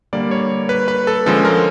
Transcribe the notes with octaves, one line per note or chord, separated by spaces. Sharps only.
D3 G3 A#3 D5
C#5
B4
B4
A4
D3 F3 G#3 C#4 A4
A#4